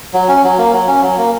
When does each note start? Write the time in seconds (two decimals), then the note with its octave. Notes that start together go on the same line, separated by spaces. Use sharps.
0.14 F#3
0.28 C#4
0.44 F#3
0.58 A#3
0.73 F#3
0.87 C#4
1.02 F#3
1.18 A#3